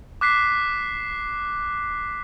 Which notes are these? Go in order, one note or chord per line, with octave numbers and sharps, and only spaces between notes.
D6 F#6 B6 C7